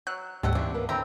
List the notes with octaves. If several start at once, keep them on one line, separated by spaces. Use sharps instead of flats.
F#3 F#6
D2 G#2 D#3 G3 A4 F#5
C#3 E3 C4 D4 E4
A#3 B3 B4
D#2 D3 C4 E4 A#5